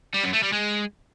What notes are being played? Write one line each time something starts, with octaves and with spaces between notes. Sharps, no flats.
G3
F#2
A3
G3
G#3